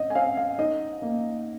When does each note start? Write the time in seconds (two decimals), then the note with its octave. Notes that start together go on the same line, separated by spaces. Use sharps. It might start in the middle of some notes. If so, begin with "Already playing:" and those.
Already playing: C4 D#5
0.10 G#5
0.15 C4 F5
0.37 F5
0.58 D#4 D#5
1.02 A#3